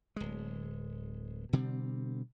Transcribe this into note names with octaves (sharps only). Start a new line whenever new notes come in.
D1 G#3
B2 D3 G3 C4